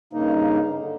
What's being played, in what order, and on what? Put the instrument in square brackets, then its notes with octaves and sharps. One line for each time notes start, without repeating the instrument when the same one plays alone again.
[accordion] G2 C#3 A#3 D#4
D3